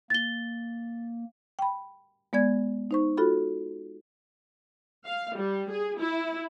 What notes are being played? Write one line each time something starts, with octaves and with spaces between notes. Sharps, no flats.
A#3 A6 G7
G5 B5
G#3 B3 D5 G#6
D#4 C5 C#6
F4 F#4 A4 B5
F5
G3
G#4
E4